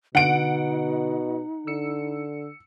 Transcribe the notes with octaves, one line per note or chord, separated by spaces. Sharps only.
B2 D3 D#4 F#5 D7
D3 E6 C#7